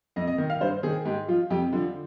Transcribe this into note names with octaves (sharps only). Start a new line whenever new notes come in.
F2 D#5
D#5
D#3
F5
G2 C5
D#3 G#4
G#2 G4
F3 F4
F2 G4
D3 F3